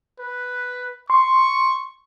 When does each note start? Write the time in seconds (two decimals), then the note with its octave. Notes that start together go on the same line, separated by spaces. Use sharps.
0.19 B4
1.10 C6 C#6